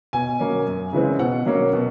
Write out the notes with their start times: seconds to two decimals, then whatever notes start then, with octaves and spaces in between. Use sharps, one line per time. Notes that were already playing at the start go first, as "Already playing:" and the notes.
0.13 B2 G#5
0.39 F#3 A#3 C#4
0.66 F#2
0.93 C#3 E3 G#3 C4
1.19 B2 F#5
1.46 F#3 A#3 C#4
1.73 B2